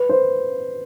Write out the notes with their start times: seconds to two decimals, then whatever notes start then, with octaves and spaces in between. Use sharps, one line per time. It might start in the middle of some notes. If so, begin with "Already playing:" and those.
Already playing: B4
0.09 C5